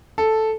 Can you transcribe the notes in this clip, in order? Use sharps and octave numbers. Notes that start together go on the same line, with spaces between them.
A4